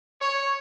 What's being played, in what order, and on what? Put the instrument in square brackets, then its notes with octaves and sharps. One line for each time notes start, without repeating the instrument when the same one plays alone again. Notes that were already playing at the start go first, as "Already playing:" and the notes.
[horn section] C#5